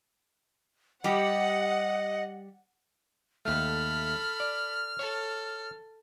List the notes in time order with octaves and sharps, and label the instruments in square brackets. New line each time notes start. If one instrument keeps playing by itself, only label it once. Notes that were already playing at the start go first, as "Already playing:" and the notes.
[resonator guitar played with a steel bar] G3 G4 [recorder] D#5 [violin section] F#5
[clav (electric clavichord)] D#2 A3 [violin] A4 B5 [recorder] F6
[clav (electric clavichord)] D5
[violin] A4 [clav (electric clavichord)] C#5